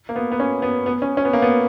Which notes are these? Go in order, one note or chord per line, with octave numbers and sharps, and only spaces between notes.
A#3
B3
B3
C#4
B3
B3
C#4
C#4
B3
A#3
B3